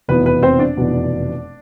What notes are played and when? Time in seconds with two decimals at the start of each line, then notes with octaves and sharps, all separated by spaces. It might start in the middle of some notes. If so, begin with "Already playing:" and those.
0.08 F1 E2 B2 B3 B4
0.26 B4
0.43 C4 C5
0.59 D4 D5
0.77 F1 E2 B2 B3